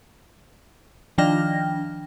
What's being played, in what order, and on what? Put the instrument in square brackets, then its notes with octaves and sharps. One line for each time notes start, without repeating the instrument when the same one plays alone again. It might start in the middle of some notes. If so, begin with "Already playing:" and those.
[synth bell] D#3 F3 D4 G5 F6 A#6